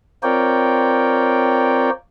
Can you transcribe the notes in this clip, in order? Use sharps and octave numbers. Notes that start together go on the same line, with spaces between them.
C4 F4 A#4 C#5 D5 G5